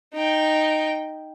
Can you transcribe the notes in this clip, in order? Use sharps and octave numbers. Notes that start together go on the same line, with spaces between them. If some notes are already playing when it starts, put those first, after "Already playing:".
D#4 G5